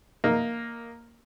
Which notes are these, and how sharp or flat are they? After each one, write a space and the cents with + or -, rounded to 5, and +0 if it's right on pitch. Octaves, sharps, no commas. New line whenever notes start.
A#3 +0 D#4 +0